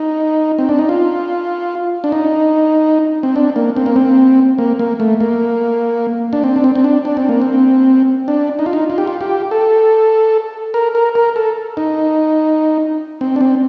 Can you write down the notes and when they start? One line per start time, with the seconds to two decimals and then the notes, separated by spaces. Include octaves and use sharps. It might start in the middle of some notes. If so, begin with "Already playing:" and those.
Already playing: D#4
0.58 C4
0.69 D4
0.79 D#4
0.89 F4
2.04 D4
2.12 D#4
3.23 C4
3.36 D4
3.56 A#3
3.76 C4
3.86 A#3
3.96 C4
4.58 A#3
4.79 A#3
5.00 A3
5.20 A#3
6.33 D4
6.44 C4
6.56 D4
6.64 C4
6.75 C4
6.84 D4
7.05 D4
7.17 C4
7.29 A#3
7.42 C4
8.28 D4
8.59 D#4
8.66 F4
8.73 D#4
8.90 F4
8.98 G4
9.07 F4
9.21 G4
9.51 A4
10.74 A#4
10.95 A#4
11.15 A#4
11.36 A4
11.77 D#4
13.21 C4
13.36 D4
13.41 C4